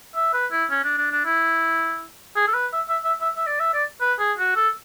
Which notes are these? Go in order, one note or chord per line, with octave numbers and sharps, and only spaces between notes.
E5
B4
E4
C#4
D4
D4
D4
E4
G#4
A4
B4
E5
E5
E5
E5
E5
D5
E5
D5
B4
G#4
F#4
A4